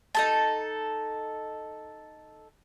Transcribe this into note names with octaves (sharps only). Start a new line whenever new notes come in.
D#4 A4 A5